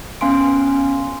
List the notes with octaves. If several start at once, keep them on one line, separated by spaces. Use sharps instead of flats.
B3 C#4 F5 G#5 C6 D7